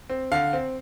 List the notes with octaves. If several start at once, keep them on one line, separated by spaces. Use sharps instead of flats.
C4
D3 F5
C4